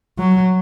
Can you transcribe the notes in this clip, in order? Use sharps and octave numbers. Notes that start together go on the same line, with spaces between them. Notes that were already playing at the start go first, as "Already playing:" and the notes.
F#3